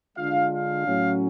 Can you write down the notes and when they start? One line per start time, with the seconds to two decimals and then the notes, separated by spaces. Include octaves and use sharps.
0.18 D3 G#3 D4 F4 F5
0.52 F5
0.86 A2 F#3 C#4